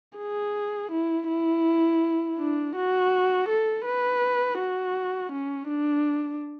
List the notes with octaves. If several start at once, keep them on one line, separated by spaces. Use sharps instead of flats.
G#4
E4
E4
D4
F#4
A4
B4
F#4
C#4
D4